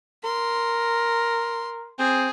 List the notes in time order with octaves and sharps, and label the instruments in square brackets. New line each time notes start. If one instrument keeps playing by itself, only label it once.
[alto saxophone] A#4 [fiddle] C6
[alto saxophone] C4 [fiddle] G#4